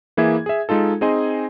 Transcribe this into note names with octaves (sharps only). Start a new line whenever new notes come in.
E3 A#3 E4 G#4 E5 G#6
G#4 E5
G#3 D#4 F4 A4
C4 D#4 G#4 D#5 G#5 C6